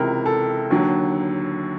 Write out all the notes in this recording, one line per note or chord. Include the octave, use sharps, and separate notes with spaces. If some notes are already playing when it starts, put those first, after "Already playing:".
Already playing: C#2 C3 E3 A#4
A4
D#2 D3 F#3